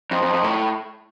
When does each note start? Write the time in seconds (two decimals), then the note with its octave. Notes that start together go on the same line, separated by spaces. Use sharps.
0.11 F2
0.22 F2
0.33 F2
0.44 A2